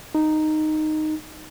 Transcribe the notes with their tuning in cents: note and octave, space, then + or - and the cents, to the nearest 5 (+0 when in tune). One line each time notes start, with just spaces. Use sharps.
D#4 -10